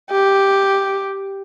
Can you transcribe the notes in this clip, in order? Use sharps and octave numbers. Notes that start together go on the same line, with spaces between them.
G4